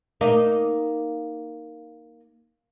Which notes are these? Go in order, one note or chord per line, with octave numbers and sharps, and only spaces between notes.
A#3 D#4